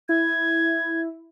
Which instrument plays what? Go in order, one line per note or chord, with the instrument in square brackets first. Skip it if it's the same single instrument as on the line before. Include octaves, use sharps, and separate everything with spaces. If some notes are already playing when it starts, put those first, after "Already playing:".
[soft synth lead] E4 [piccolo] G#6